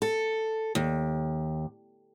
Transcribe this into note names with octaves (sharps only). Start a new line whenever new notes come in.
A4
D#2